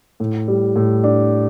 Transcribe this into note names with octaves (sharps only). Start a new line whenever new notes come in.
A2
G3
A2
D4